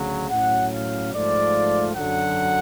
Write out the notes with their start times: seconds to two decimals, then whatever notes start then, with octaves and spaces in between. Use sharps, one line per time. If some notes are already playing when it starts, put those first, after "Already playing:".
Already playing: D2 C#3 F#3
0.30 A2 F#3 C#4 F#5
0.72 F5
1.13 G#2 F3 A3 F4 D5
1.95 F#2 D3 F#3 F#5